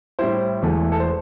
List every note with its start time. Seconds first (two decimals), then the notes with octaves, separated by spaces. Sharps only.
0.19 A2 G3 E4 C5
0.62 E1 E2 E3 A3
0.92 A4
1.00 C5